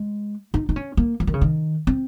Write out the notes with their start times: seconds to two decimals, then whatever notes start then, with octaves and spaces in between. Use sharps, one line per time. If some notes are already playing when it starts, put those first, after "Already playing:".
Already playing: G#3
0.54 D#4
0.69 D#4
0.76 C#4
0.97 A#3
1.20 F3
1.27 D#3
1.34 C#3
1.41 D#3
1.87 C4